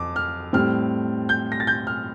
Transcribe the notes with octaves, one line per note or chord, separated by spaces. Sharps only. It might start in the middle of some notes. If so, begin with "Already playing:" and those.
Already playing: F2 D6
F6
A2 G3 C4 F6
G6
A#6
A6
G6
F6